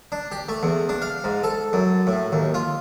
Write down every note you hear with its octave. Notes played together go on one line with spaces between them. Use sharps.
D4
G4
A3
E2
D4
F5
G#2
A4
F#2
A2
D#2
F4